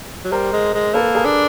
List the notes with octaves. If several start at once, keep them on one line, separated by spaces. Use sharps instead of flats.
F#3
G3 A#4 C5
G#3
G#3
A#3 A4 B4
G#4 A#4
D4